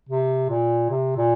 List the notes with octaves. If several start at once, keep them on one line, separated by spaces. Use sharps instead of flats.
C3
A#2
C3
A#2